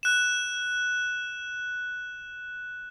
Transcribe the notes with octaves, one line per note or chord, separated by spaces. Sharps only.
F#6 E7